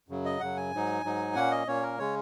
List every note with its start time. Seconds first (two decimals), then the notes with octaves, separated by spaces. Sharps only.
0.08 F#2 C#3 F#3
0.25 D#5
0.40 F#2 C#3 F#3 F#5
0.57 G#5
0.73 G#2 F#3 D#4
1.04 G#2 F#3 D#4
1.35 A#2 A#3 C#4 F#5
1.51 D#5
1.67 A#2 A#3 C#4 C#5
1.82 A#4
1.98 C#3 G#3 C#4 C#5